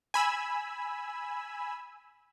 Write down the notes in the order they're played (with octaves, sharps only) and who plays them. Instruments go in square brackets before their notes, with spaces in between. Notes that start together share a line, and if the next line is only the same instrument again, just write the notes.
[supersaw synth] G#5 B5 E6